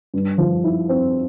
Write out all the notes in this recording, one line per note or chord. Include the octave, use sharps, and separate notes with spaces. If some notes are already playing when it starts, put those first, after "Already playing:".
G2
F3
E4
C4